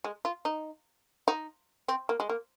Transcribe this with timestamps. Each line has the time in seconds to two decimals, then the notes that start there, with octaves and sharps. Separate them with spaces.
0.04 G#3
0.25 F4
0.45 D#4
1.28 D#4
1.88 C4
2.09 A#3
2.20 G#3
2.29 A#3